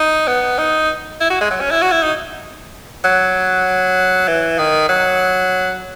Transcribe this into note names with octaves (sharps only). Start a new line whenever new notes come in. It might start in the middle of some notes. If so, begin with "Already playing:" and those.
Already playing: D#4
B3
D#4
E4
F#4
G#3
F#3
C#4
E4
F#4
E4
D#4
F#3
E3
D#3
F#3